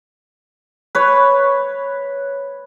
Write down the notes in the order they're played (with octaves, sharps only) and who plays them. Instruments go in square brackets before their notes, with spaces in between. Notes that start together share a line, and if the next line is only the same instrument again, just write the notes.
[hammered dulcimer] B4 C#5